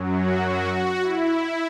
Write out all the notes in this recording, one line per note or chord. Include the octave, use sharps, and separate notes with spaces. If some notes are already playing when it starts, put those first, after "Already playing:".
Already playing: F#2 F#3
F#4
F#4
F#4
E4